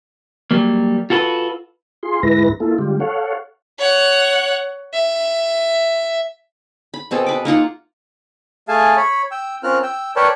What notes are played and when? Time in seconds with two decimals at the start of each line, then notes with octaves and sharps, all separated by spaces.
0.51 F#3 G3 A#3
1.10 F4 F#4 A4 B4
2.03 F4 G#4 C6
2.23 D2 G#2 G#3 E4 B4 A#6
2.60 A#3 E4 F4 A4
2.78 D3 G3 G#3 F4 G4
3.00 A4 C#5 F5 F#5
3.79 C#5 F#5
4.94 E5
6.94 B5
7.11 B2 C4 G#4 A4
7.26 B4 D6
7.45 A#3 D#4 F4 F#5
8.68 A3 G#4 F5 G#5 A5
8.97 C#5 B5
9.31 G5 E6
9.63 C4 C#4 F4 A#4 F6 F#6
9.83 G5 E6
10.16 A#4 B4 C#5 D5 G5 A5